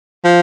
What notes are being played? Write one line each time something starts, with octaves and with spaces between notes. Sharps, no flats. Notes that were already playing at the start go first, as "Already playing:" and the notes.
F3